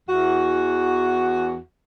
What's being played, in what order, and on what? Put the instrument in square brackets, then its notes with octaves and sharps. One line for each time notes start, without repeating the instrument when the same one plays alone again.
[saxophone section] E2 F#4